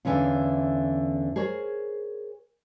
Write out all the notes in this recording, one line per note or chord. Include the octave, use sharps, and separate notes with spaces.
E2 D3 E3 C#4 F4
G#4 A#4 C5 C#5